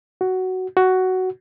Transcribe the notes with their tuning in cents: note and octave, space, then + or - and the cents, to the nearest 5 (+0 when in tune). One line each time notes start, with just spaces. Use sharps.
F#4 +10
F#4 +10